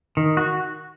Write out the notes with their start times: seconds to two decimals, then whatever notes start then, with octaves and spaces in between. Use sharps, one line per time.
0.17 D#3
0.37 F#4